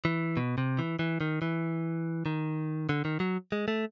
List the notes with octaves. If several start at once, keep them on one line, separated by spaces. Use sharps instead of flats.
E3
B2
C3
E3
E3
D#3
E3
D#3
D3
D#3
F#3
G#3
A3